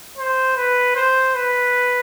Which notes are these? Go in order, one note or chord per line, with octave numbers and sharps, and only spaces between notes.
C5
B4
C5
B4